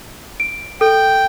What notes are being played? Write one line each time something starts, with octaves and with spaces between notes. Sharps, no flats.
D7
A4 G5